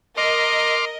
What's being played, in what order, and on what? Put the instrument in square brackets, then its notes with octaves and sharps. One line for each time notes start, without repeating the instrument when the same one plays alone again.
[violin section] A#4 D#5 [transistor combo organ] C6 D6 F6